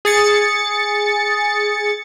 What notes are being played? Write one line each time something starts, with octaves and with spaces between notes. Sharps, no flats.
G#4 A6 C#7